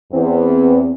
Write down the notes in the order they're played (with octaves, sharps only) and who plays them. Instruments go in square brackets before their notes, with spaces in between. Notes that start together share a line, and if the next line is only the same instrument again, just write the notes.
[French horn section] E2 [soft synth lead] C4